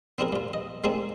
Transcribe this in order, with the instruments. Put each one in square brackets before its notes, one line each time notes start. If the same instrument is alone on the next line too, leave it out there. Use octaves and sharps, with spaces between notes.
[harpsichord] B3 C4 D4 E4 G#4 A#4
G2 F4
D#5
G#3 A#3 C4 D4 D#4 G#4